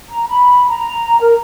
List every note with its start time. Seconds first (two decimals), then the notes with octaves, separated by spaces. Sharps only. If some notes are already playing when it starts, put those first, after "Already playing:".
0.10 A#5
0.29 B5
0.68 A#5
1.21 A#4